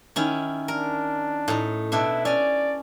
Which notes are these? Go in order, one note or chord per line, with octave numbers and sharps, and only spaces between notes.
D#3 C#4 E4
D4 A#4
A2 D#4
B2 D4 E4 E5
C#4 D5 G#5